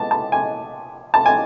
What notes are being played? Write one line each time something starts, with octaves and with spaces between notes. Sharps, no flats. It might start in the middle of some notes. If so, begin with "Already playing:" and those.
Already playing: G#3 B3 A5
A5
G#5
A5
G#5